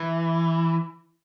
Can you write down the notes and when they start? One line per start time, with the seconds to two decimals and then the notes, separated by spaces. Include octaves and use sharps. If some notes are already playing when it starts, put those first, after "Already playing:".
Already playing: E3